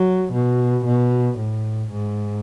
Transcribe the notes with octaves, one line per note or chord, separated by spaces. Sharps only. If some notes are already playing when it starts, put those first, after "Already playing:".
Already playing: F#3
B2
B2
A2
G#2